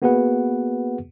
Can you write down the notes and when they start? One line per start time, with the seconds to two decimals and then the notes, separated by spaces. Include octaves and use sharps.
0.02 A#3 B3 F#4 G#4 B4 F#5